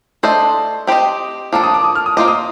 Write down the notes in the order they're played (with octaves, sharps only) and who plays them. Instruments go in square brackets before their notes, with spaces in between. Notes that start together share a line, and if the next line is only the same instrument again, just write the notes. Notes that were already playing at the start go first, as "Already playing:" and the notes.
[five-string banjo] A3 D4 A4 C5 D#5 [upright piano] C6
[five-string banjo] C4 G4 C5 D#5
[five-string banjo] F3 A#3 D4 A4 [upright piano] D6
[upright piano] D#6
D6
D#6
F6
D#6
[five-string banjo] A#3 F4 C5 D#5 [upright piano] D6
[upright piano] D#6